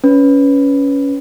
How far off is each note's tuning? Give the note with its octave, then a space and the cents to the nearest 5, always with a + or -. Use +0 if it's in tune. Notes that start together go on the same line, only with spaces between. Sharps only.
C#4 +10 B4 +5